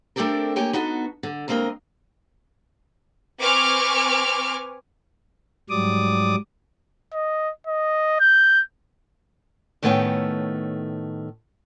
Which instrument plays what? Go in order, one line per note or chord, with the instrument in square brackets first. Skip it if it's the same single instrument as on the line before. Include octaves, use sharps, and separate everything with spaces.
[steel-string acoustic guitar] A3 C4 D4 G4 A4 A#4
A3 A#3 G4 C#5 G5 G#5
B3 D#4 F#4 A4
D3
D2 G#3 A#3 C4 A#4 D#5
[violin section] C4 B4 G#5 C#6 D6 F6
[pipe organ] G#2 F#3 G3 D5 D6 D#6
[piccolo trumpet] D#5
D#5
G6
[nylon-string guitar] A2 D#3 A3 B3 C#4 G5